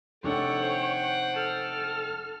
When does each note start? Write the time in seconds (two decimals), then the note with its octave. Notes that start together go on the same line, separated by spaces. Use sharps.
0.24 F1 D#3 D4 A4 C#5 F#5 G5
0.62 C5
1.34 A4 F6